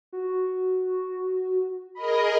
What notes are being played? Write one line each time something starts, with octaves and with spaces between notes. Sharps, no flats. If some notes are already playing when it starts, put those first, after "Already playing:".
F#4
G#4 A#4 D#5 B5